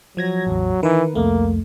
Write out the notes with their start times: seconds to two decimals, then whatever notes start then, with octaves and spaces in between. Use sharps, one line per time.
0.17 F3 F#3 G#6 A#6
0.47 A1 E2
0.83 D#3 E3 A#4 B4
1.15 C2 F2 A3 A#3